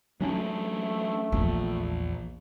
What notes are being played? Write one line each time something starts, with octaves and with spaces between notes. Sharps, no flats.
F#3 A3 C#4 D4
A#1 E2